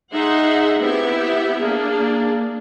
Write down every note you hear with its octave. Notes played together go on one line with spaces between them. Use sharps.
D#4 G#4 E5 F#5 C6
B3 C4 E4 G4 E5
A#3 D4 G#4